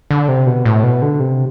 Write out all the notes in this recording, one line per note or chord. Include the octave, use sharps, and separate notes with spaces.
D3
C3
B2
A2
B2
D3
C3